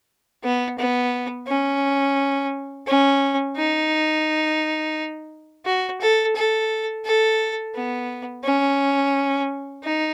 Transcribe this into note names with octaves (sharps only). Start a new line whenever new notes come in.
B3
B3
C#4
C#4
D#4
F#4
A4
A4
A4
B3
C#4
D#4